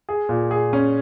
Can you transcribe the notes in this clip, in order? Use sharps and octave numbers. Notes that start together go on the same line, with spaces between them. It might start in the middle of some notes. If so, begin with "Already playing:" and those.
G#4
A#2
G#4
C#4